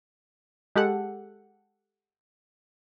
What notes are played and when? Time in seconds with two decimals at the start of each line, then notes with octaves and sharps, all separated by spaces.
0.76 G#3 G4 A4 F#5